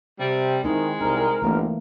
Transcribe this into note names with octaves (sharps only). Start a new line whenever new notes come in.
C3 G3
D#3 G#3 C4 D#4 E4
C2 C4 D#4 A#4
G1 E3 A3 A#3